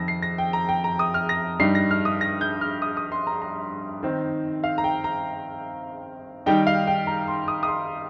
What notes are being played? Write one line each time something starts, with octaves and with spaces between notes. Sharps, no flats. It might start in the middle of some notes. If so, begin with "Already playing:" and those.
Already playing: F2 D#3 A#6
C7
A#6
G5
A#5
G5
A#5
D#6
F6
A#6
G2 G3 D#4 C7
A#6
F6
D#6
A#6
G6
F6
D#6
D#6
C6
A#5
A#5
D#3 C4 D#4
F5
A#5
G5
A#5
D#3 G3 D#4 G5
F5
G5
A#5
C6
D#6
D#6
C6